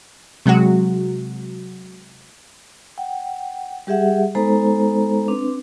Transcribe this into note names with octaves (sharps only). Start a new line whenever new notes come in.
C3 F#3 G#3 F#4
F#5 G5
G3 G4 G#4 E5 F#5
G#3 B3 D#4 A4 C5 A#5
C4 D4 B4